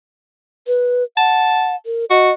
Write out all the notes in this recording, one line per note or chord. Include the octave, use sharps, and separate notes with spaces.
B4
F#5 A5
A#4
F#4 D#5